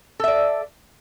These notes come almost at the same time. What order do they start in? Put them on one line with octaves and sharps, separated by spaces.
A4 E5 D5